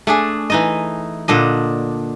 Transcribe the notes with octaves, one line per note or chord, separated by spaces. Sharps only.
A3 D4 G#4
E3 D#4 D#5
A#2 D3 D4 D#5